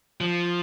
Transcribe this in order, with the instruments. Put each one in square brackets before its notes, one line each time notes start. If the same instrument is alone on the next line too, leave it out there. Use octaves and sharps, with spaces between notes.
[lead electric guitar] F3